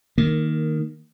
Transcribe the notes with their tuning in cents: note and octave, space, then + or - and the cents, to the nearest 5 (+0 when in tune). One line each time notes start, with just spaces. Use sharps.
D#3 +0 A#3 -10